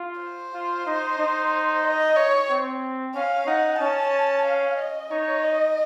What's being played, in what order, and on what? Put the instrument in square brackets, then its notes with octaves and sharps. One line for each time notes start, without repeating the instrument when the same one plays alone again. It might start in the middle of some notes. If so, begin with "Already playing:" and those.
Already playing: [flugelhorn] F4
[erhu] C5
[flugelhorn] F4
D#4
D#4
[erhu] D#5
C#5
[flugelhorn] C4
[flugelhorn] C#4 [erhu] F5
[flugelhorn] D#4 [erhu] F#5
[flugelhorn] C#4 [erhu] A5
[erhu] F5
D#5
[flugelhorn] D#4 [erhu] C#5
[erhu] D#5